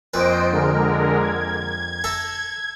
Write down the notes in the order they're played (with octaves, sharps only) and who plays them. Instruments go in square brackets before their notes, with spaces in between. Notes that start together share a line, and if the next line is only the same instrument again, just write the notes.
[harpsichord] F2 A#2 B4 [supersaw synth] C5 D#5 D7
[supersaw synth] D3 G#3 A#4
G#6
[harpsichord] A4 E5 A#5